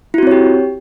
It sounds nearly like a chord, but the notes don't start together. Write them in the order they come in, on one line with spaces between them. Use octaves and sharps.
E4 F#4 C4 C#5 G4